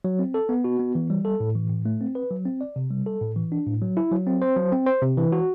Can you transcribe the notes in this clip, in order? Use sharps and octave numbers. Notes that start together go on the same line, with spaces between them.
F#3
C4
A4
B3
F#4
B3
E3
G3
A4
A2
E3
A2
A3
C4
B4
F#3
C4
D5
C3
G3
A4
A2
E3
D4
A2
F#3
E4
F#3
C4
C5
F#3
C4
C5
C3
E3
F#4